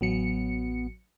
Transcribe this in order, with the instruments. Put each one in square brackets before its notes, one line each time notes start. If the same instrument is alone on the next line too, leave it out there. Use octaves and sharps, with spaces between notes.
[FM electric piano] A1 F#3 C#7 [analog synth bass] B3